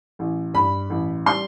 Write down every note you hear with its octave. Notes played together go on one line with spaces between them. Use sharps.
A1
G2 B5
A1
G3 C6